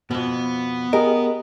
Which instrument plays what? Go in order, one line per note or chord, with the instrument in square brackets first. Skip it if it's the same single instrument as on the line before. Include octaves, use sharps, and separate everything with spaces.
[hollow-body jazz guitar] F2 B2 [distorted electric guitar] B3
[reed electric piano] G4 G#4 D#5 [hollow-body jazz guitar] A#4